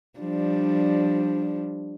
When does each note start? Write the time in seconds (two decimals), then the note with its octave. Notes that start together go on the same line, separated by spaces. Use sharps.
0.20 F3 G3 D4